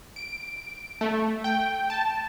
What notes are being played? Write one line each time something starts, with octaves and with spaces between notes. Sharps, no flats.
D7
A3
G5
A5